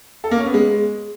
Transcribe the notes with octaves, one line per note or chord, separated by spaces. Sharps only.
A4
A#3
C#4
B3
G#3